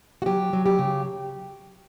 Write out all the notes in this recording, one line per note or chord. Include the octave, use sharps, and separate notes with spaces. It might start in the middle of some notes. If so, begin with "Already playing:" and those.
F#4
F#3 G4
F#3
G4
C#3